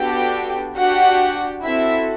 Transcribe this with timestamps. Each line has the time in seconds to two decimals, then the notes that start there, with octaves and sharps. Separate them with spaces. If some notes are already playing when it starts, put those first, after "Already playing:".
Already playing: B3 D4 F#4 G4 A4 G5
0.77 D4 F#4 G4 F#5
1.64 C4 E4 F#4 A4 E5